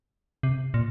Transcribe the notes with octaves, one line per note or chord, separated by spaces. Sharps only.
C3
A#2